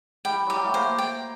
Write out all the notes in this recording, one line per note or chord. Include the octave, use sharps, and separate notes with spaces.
G3 G5
F#3 G4
G3
A3
A#3 C5
G5